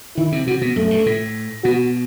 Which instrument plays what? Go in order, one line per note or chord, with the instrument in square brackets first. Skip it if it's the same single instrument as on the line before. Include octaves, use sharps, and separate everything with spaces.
[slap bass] D#3 [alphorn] E4
[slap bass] C3
[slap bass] C3 [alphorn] F#4
[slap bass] B2
[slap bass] F#2 [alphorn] A3
[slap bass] G2
A2
[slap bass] B2 [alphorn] F#4